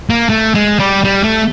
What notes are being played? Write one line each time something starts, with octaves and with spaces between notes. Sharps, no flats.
A#3
A3
G#3
G3
G3
A3